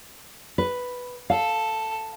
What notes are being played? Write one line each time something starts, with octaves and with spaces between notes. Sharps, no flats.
B4
A4 F5